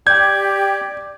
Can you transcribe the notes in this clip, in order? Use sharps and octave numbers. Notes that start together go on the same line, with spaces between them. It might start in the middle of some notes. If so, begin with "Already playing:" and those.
G4 D5 G6 G#6